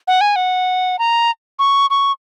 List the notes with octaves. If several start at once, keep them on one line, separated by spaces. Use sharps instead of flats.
F#5
G#5
F#5
A#5
C#6
C#6